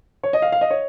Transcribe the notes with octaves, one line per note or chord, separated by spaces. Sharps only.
C#5
D#5
F5
F5
D#5
C#5